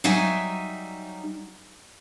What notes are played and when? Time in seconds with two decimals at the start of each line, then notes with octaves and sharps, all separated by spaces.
0.04 F#3 G3 D#4 E5 G#5